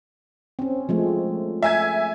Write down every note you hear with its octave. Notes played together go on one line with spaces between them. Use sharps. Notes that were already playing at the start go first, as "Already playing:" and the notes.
C4 C#4
F3 G#3 A3
E5 G#5 G#6